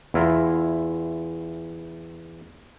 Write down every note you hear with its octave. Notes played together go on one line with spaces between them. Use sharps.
E2 E4 F4 A#5